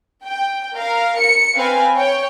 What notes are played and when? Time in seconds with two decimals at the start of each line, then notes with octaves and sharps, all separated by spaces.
0.25 G5
0.77 A#4 F5
1.19 C#7
1.56 C4 B4 F5 G#5
1.96 C#5 G5